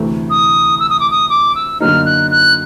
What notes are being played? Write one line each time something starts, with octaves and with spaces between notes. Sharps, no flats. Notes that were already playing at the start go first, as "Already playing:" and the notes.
Already playing: D2 C3 E3 A3
D#6
E6
D#6
D6
D#6
D6
E6
F#2 D3 F#3 A#3 D#4 F6
F#6
F#6